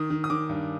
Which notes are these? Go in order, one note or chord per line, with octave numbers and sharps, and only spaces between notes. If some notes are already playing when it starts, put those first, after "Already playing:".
Already playing: D#3 D#6
D#3
D#6
D#3 D6
G2